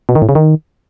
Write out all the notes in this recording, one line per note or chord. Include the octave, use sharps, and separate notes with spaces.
B2
D#3
A2
C#3
D#3